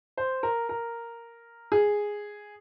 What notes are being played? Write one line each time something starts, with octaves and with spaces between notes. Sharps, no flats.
C5
A#4
A#4
G#4